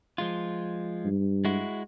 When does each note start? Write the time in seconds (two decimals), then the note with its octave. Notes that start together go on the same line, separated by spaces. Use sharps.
0.18 F3 G#3 F4
1.05 G2
1.45 G#3 E4 F#4